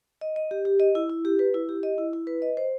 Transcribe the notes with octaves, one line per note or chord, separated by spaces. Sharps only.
D#5
D#5
G4
G4
D#5
E4
E4
G4
B4
E4
G4
D#5
E4
E4
B4
D#5
C5